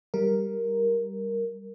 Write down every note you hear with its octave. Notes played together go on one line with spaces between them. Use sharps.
G3 A#4